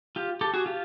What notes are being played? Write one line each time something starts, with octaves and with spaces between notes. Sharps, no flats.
F4 G4
G4 A4
F#4 G#4
F4 G4